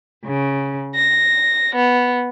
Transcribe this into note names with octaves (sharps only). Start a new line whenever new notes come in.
C#3
A#6
B3